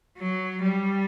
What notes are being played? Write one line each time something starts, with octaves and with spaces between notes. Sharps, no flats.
F#3
G3